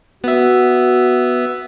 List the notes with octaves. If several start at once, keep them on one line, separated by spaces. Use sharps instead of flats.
B3 F#4 E5